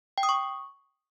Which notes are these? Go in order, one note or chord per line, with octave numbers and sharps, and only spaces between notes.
G5
D#6
C#6